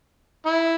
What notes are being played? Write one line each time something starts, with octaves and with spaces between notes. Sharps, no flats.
E4